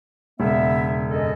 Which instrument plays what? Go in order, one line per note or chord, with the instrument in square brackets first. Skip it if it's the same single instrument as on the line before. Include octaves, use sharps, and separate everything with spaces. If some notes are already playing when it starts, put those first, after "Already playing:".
[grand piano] E1 C#3 [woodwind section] B3 E5
[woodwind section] F#2 A4 D#5